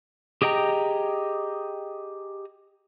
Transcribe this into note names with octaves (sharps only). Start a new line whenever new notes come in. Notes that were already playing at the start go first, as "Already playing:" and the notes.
G4 G#4 D#5 G5 A#5